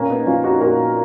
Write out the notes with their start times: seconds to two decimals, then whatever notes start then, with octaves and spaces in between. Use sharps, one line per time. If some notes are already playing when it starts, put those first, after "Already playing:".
Already playing: A#2 A#3 C#4
0.10 B3 D#4
0.26 F3 C#4 F4
0.44 D#4 F#4
0.61 A#2 F#4 A#4